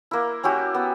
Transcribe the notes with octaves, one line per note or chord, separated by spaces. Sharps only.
A#3 E4
C#4 E4 F#4 G4
B3